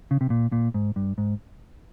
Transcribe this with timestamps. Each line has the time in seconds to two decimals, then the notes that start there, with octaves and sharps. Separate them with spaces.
0.11 C#3
0.21 C3
0.30 A#2
0.52 A#2
0.74 G#2
0.96 G2
1.18 G#2